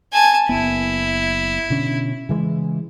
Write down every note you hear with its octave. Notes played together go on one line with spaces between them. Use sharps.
G#5 A5
F#1 E2 B3 E4
B2 D3 C#4
C#3 E3 G#3